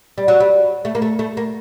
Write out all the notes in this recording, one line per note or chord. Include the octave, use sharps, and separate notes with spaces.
G3
F#3
G3
A3
A#3
A3
A3
A#3